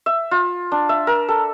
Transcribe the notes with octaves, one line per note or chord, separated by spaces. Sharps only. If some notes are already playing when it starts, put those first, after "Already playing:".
E5
F4
D4
E5
A#4
A4